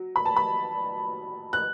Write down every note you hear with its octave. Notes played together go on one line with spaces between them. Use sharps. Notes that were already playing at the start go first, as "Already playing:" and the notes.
Already playing: F#3
B5
A5
B5
F#6